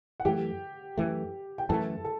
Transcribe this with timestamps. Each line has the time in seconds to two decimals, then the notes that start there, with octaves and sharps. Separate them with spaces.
0.20 F#5
0.25 F#2 E3 A3 G4 G5
0.98 F#2 E3 A3
1.58 G5
1.69 F#2 E3 A3 A4 A5
2.04 A4